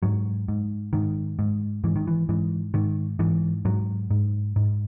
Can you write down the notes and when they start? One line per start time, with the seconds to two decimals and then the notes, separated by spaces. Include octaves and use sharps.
0.03 G#2 F#3
0.48 G#2
0.93 G#2 D#3
1.39 G#2
1.84 G#2 E3
1.96 D#3
2.07 E3
2.29 G#2 E3
2.74 G#2 D#3
3.19 G#2 E3
3.65 G#2 F#3
4.11 G#2
4.56 G#2